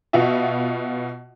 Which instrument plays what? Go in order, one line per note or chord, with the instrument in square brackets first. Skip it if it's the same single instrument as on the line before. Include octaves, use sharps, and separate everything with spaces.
[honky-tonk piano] B2 B3 F4 F#4 E5